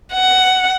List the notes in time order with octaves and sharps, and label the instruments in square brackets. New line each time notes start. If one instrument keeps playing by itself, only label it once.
[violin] F#5